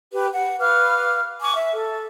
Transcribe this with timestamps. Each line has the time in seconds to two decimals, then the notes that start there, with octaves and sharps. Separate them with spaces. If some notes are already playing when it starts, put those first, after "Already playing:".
0.12 G4 B4
0.33 F#5
0.59 B4 F5 D6 F6
1.41 G#5 C#6 D6
1.55 E5
1.74 A4